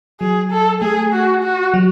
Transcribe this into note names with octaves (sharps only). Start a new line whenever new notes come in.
F#3 G#4
A4
A3 G#4
F#4
F#4
F#3